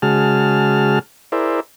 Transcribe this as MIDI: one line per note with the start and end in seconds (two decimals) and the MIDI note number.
0.02 0.99 49
0.02 0.99 56
0.02 0.99 66
0.02 0.99 68
0.02 0.99 81
0.02 0.99 89
1.32 1.60 64
1.32 1.60 68
1.32 1.60 70
1.32 1.60 72
1.32 1.60 74
1.32 1.60 76